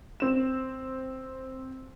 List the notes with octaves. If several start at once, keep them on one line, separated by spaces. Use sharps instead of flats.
C4 E7